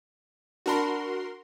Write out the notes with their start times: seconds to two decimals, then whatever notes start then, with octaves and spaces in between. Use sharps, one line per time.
0.66 D4 F#4 A#4 A5 B5 C6